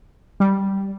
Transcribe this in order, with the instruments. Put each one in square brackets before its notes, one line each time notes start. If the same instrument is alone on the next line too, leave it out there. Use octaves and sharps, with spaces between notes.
[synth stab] G3